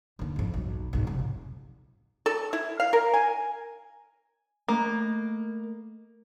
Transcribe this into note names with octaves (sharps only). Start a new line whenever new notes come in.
D#2 D3
G#1 F2
B1
B1 G#2
F1
A4
E4
F5
A#4
G#5
A3 A#3